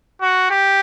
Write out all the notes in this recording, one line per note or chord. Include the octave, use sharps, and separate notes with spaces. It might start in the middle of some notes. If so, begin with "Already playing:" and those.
F#4
G4